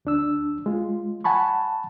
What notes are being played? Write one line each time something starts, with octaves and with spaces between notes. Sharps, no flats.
D2 D4 E6
G#3 F4
F#5 G#5 A5 B5 C#6